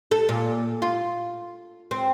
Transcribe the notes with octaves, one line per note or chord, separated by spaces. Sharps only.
A4
A#2
F4
C4